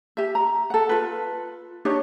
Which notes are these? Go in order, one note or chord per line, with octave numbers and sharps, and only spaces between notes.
G4 E5
A#5
A4 F#5
F4 B4
D4 D#4 G4 C#5